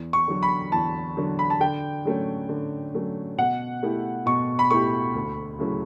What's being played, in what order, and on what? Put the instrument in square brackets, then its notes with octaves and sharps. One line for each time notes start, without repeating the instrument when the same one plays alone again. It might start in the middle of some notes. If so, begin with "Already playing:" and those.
Already playing: [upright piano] E2
[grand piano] C#6
[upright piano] D3 F#3
[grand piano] B5
[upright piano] E2 [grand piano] A5
[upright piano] D3 F#3
[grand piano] B5
A5
[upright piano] D3 [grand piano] G5
[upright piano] F#3 A3 C#4
D3
F#3 A3 C#4
[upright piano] B2 [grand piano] F#5
[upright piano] A3 E4 G4
[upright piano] B2 [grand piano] C#6
[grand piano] B5
[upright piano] A3 E4 G4 [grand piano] C#6
[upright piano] D2
C#3 F#3 A3 E4